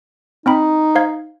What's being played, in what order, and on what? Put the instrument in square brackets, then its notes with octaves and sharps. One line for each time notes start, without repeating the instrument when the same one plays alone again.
[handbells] C4 G5 B5 [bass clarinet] D#4
[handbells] C5 F5 G#6